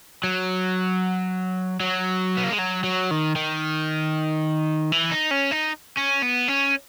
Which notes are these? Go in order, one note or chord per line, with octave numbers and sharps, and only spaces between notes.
F#3
F#3
B3
A#3
G#3
F#3
F#3
D#3
D#3
E3
D#4
C#4
D#4
C#4
B3
C#4